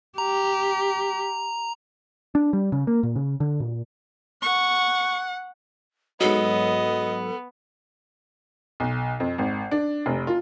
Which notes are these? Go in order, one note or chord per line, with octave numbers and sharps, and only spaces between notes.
G4 A#5
D4
G3
C#3
A#3
A#2
C#3
D3
A#2
F#5 C#6
G#2 F#3 B3 A4 D#5
B1
F2
G#1
D4
F1
F4